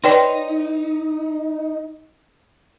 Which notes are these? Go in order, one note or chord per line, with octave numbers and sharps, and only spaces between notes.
D#4 B4 C#5 D5 G5 C6 A#6